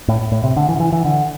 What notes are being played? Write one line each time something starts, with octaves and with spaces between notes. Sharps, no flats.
A2
A2
C3
D3
E3
D3
E3
E3
D3